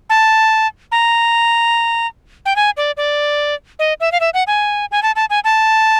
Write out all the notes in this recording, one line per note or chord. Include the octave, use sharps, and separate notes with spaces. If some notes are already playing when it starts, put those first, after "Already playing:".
A5
A#5
G5
G#5
D5
D5
D#5
E5
F5
E5
F#5
G#5
G#5
A5
A5
G#5
A5